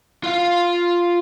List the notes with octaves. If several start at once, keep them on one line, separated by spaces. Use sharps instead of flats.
F4 F5